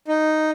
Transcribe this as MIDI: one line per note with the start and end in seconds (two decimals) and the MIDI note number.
0.08 0.51 63